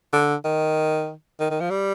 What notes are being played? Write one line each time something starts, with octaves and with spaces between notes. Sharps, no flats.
D3
D#3
D#3
D#3
F3
G3